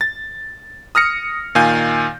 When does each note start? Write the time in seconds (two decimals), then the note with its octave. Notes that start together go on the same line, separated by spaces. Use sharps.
0.01 A6
0.95 D#6 F6 A#6 C#7
1.55 A#2 D#3 F5 G#5 G6